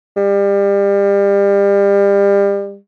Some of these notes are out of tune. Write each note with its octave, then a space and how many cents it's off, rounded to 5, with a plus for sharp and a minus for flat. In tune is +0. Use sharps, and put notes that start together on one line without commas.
G3 +30